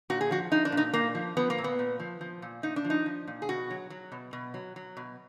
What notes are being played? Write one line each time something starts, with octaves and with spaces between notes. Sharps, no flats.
A#2 F#4
G#4
F3 F#4
F3 D#4
D4
A#2
D#4
A#2 A#3
F3
F3 B3
A#3
A#2
B3
A#2
F3
F3
A#2
A#2 D#4
D4
F3
D#4
F3
A#2
G#4
B2 F#4
F#3
F#3
B2
B2
F#3
F#3
B2